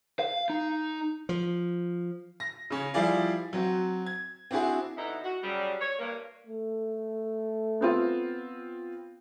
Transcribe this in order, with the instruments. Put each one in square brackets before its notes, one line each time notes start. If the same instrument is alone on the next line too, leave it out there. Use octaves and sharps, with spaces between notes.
[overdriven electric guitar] F5
D#4
[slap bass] F3
[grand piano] A#6
C#3 C#4
F3 G3 E4 G#4 D5 F5
F#3 C4 F#4
G#6
C4 D4 E4 F#4 G#4
[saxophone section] B2 D3 D#4 E4
F#4
C#3 F#3 G3
C#5
G2 A#3
[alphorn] A3
[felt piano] B3 C4 F4